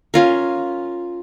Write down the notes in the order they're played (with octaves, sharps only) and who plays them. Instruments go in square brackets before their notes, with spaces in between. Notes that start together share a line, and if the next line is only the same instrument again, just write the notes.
[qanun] C#4 F4 A#4